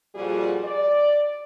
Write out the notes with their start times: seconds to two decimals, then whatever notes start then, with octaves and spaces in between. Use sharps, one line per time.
0.14 F2 A#2 G3 F4 F#4 G#4
0.64 D5